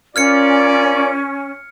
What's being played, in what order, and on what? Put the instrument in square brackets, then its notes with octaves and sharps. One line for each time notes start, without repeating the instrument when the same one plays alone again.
[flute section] C#4 [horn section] F4 A#4 D5 [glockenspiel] F6 G#6 C#7